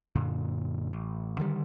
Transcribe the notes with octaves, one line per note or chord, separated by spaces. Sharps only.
F#2 A#2 D3
A1
D3 D#3 G3